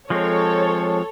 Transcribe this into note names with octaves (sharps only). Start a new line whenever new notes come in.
F3 G#3 C4 A4 C#5